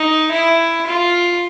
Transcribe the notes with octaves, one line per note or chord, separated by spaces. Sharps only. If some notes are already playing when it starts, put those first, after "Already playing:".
Already playing: D#4
E4
F4